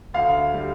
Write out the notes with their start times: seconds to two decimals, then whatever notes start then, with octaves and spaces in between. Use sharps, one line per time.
0.14 D2 F5
0.54 G3